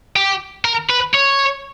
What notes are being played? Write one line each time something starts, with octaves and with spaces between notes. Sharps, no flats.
G4
A#4
B4
C#5